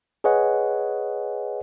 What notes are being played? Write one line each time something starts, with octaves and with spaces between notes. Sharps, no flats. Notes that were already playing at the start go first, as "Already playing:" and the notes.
G#4 B4 C#5 D#5 F#5 G#5